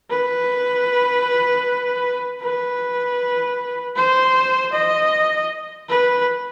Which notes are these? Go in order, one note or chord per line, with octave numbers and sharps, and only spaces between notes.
B4
B4
C5
D#5
B4